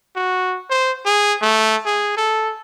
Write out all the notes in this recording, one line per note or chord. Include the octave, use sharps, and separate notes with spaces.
F#4
C5
G#4
A3
G#4
A4